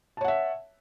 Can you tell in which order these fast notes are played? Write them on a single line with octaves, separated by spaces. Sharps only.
A5 C#5 F#5 E5